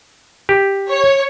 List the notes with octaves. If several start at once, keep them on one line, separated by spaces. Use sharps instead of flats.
G4
C#5